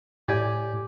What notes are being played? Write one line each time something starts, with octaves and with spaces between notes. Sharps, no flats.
A2 G4 D5 G#5